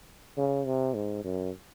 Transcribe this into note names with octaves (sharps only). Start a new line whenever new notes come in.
C#3
C3
G#2
F#2